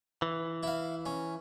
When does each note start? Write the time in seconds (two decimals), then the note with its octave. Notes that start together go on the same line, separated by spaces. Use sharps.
0.22 E3
0.63 E4 F5
1.06 C#4